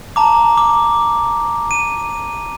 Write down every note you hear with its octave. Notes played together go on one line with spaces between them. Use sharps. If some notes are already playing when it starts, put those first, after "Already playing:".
A5 A#5 D6
D6
D#7